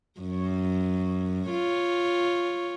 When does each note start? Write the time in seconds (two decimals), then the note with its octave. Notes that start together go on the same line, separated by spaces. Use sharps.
0.21 F#2
1.48 F4 C#5